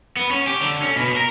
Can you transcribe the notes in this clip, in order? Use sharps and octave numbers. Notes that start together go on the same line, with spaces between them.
B3
C#4
G4
D3
C#4
B2
A#4